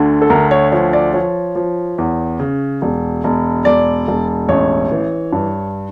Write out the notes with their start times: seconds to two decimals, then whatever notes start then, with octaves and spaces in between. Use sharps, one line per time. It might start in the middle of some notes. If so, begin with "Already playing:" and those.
Already playing: D2 D3
0.22 A4
0.30 D2 A#4
0.51 C#5
0.72 F3 C#5
0.93 D5
1.14 F3 C#5
1.55 F3
1.98 E2
2.40 C#3
2.82 E1
3.24 E1
3.65 E1 D5
4.08 E1
4.49 A1 C#5
4.91 E3
5.32 G2